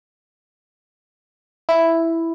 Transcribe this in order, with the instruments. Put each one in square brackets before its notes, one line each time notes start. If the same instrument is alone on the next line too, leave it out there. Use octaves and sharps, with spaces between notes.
[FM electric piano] E4